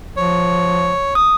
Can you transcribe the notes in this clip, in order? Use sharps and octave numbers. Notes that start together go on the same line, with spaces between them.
F3 C#5
D#6